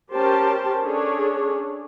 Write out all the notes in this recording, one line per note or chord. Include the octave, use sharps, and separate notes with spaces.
C#4 G4 A#4 C5 G5 A5
C#4 D4 G#4 A4 C#5